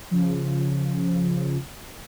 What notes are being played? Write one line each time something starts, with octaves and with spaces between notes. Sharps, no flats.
C#3 F3